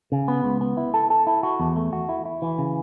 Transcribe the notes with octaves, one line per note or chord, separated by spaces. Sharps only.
C#3
B3
C#2
B3
E4
A4
A4
E4
F#4
E2
A3
F#4
E4
E4
E3
C#3